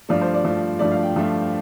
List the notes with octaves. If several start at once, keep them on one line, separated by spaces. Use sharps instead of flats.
G2 F3 A3 D5
C5
D5
G2 F3 A3
G2 F3 A3 D5
F5
G5
G2 F3 A3